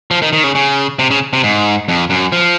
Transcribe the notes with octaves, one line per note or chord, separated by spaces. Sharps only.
F3
D#3
D#3
C#3
C#3
C3
C#3
C3
G#2
F2
F#2
F3